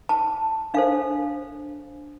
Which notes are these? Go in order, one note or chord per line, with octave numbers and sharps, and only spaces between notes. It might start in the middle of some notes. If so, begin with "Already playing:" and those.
A5
D4 A4 C5 F5